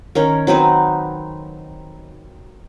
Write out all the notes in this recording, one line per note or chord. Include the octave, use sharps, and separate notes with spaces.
D#3 C#4 A#4
F#3 C4 D#4 B4